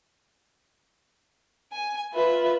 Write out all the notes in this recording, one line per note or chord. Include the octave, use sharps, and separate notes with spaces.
G#5
F4 B4 E5